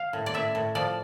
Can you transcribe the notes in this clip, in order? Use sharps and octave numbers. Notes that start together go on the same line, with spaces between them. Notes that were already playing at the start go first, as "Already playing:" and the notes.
Already playing: F5
A2
D5
A2 E5
A2
F3 D5